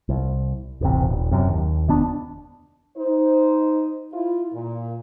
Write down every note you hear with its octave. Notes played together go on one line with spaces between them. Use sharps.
C2
D#1 A1 C3
D#1
F#1 F#2 C3
D#2
F1 D#3 B3 D4
D#4 C5
E4 F4
A#2